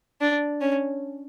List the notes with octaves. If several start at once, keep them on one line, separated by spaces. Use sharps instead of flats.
D4
C#4